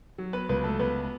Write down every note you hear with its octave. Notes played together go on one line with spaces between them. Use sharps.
F#3
B3 B4
C#2 B3 B4
A3 A4
C#2 B3 B4